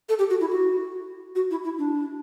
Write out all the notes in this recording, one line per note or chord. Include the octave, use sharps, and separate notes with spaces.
A4
G4
F#4
E4
F#4
F#4
E4
E4
D4